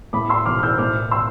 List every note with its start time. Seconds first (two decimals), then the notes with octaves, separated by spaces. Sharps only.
0.13 A2 B5 D6
0.29 C6 E6
0.45 B1 D6 F6
0.59 F6
0.63 E6 G6
0.78 A2 D6 F6
1.11 C6 E6